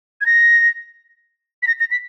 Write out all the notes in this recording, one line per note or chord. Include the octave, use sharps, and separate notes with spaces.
G#6
A#6
B6
A#6
A#6
B6